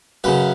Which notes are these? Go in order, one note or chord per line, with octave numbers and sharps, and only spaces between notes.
F#2 C#3 B4